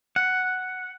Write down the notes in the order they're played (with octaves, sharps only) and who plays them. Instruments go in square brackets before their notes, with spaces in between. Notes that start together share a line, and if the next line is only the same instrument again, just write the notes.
[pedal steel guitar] F#5